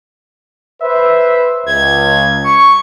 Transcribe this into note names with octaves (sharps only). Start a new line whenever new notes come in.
B4 C5 E5
C#2 G#6
C#6